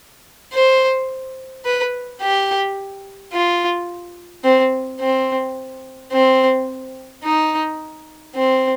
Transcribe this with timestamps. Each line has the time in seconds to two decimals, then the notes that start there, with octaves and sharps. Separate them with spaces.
0.53 C5
1.65 B4
2.21 G4
3.33 F4
4.44 C4
5.00 C4
6.12 C4
7.24 D#4
8.35 C4